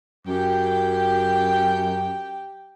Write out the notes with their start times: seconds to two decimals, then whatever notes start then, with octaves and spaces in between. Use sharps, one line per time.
0.27 F#2 G4 G5